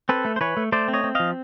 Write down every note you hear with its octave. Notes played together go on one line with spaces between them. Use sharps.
C4 A4 B4
A3
C5
E3 B4 C#5
A3
A3 C5 D5
C4
C#5 D#5
C4
F3 D#5 F5